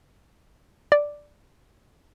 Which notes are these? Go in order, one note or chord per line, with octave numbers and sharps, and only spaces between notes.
D5